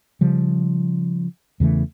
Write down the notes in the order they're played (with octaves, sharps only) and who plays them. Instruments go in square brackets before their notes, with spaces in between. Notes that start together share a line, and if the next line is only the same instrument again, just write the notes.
[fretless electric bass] C#3 F3 G3
E2 C#3 E3 A3